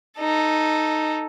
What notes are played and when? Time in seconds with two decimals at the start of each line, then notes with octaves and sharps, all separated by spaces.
0.19 D#4 A4